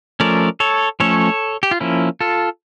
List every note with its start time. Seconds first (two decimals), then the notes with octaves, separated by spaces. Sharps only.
0.20 F3 A3 C#4 A#4 D5
0.60 A4 C#5
1.00 F3 A3 C#4 A4 C#5
1.63 G4
1.71 F4
1.80 F3 A#3 C#4 E4
2.20 F4 A4